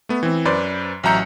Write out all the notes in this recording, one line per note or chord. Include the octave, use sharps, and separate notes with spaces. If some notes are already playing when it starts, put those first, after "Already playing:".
A3 B3
E3 C4
F#2 B4 C5 D5 C6
A1 F#3 E5 A#5 G6 C#7